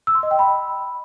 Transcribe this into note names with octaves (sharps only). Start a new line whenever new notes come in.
E6
C6
D#5
G5
B5